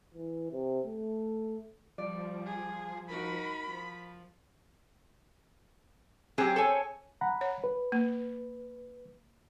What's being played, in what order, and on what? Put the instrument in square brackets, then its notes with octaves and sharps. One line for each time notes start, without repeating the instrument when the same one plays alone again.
[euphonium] E3
C3
A3
[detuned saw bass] F3 [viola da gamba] G3 [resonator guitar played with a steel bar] D5
[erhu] G#4
[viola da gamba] D#4 F#4 A#4 [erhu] B5
[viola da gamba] F3
[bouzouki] F#3 G4 [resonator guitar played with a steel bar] C4 G#4
[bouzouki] A4 C#5 G#5
[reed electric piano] F#5 A#5 B5
[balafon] C#5
[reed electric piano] B4
[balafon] A#3